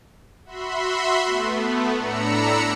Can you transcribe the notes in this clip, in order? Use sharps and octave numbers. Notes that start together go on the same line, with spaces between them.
F#4 E5 B5 C6
A3 B3
A2 D4 A#5 B5 E6 C#7